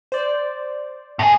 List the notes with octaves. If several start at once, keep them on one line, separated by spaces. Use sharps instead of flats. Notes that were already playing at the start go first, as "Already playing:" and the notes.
C5 D5
A2 G#4